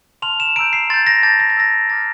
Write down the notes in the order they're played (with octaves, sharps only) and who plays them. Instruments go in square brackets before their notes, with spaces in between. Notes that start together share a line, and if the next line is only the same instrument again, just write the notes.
[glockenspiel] A5 C6 F6 F7
E7
A#5 E6 G6 D7
C7
C6 G6 A6
A#6
A5 D6 G6 A6
A#6
A6
C6 E6 G6 A#6
A#5 D6 F6 A6